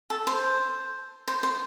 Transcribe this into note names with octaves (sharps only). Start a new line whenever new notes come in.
A4
C5
C5
C5